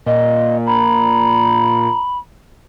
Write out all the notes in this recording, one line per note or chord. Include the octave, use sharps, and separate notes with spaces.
A#2 D#5
A#5 B5